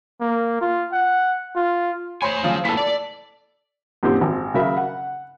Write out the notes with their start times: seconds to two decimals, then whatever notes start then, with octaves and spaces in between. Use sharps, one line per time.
0.20 A#3
0.61 F4
0.92 F#5
1.56 F4
2.22 C5 C#5 G#5 B5 C6
2.43 C#3 F3 F#3
2.65 A#3 B3 E4 A4 B6
2.77 D5
4.03 F#2 A#2 D#3 C4 G4
4.21 G#1
4.54 C#3 F#3 A#4 E5 B5
4.77 F#5